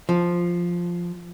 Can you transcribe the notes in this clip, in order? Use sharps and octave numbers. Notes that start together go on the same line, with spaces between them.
F3